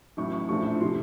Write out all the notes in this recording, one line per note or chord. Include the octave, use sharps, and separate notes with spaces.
A1 A2 F#3 C#6
C#6
A#1 A2 F3 A3 C#6
C3 F3 C6